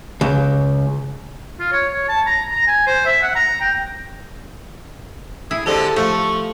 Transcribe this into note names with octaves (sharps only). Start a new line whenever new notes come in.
C#2
F4
C#5
C#5
A5
A#5
A#5
G#5
C5
E5
F#5
A#5
G5
E4 G#4
D3 G#3 C4 G4 A4 A5
F3 A3 C#6